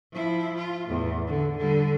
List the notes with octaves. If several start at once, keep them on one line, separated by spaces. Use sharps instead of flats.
F3 E4
F4
E2 A2
D3
D3 G3